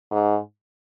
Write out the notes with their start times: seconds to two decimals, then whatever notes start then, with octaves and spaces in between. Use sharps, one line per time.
0.11 G#2